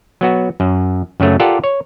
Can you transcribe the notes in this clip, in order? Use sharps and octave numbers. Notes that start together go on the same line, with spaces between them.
F#3 B3 F#4
F#2
F#2 C#3 F#3 A3
F4 G4 A4 A#4 D5 F#5
C#5